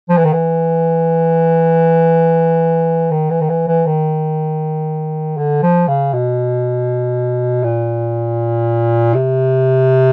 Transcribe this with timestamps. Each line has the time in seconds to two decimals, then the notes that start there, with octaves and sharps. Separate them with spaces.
0.09 F3
0.17 E3
0.25 D#3
0.33 E3
3.11 D#3
3.30 E3
3.41 D#3
3.49 E3
3.68 E3
3.86 D#3
5.37 D3
5.62 F3
5.88 C#3
6.13 B2
7.63 A#2
9.14 C3